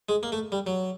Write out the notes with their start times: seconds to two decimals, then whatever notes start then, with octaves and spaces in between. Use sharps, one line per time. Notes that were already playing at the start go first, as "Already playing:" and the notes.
0.09 G#3
0.23 A#3
0.32 A3
0.52 G3
0.67 F#3